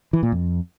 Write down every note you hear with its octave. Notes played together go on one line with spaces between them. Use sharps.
E3
A#2
F2